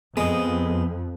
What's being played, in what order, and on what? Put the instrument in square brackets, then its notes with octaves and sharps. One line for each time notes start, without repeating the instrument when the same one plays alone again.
[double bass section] F2 [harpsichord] G#3 [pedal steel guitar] B3 D#5